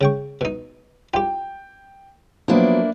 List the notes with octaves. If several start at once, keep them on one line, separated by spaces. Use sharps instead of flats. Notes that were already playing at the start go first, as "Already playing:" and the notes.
C#3 G5 C#6
B2 D#4
F4 G4 G5
F3 F#3 A#3 B3 D4 E4